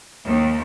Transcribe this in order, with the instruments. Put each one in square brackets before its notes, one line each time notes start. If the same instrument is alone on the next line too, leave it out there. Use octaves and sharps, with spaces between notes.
[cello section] D#2